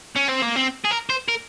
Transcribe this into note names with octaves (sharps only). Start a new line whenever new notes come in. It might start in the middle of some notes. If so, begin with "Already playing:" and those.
C#4
C4
A#3
C4
G#4
A#4
C5
A#4